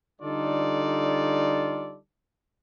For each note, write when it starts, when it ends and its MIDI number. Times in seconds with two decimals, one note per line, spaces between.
0.21 1.97 50
0.21 1.97 55
0.21 1.97 63
0.21 1.97 65
0.21 1.97 69
0.21 1.97 74